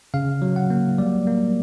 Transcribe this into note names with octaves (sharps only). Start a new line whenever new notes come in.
C#3 F5
F#3
F#5
A#3
G3 D5
A#3